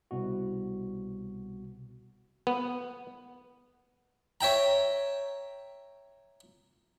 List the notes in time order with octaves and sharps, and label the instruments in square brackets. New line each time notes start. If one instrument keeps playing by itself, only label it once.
[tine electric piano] C2 B2 F#4
[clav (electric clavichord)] B3
[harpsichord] C#5 E5 G5 A#5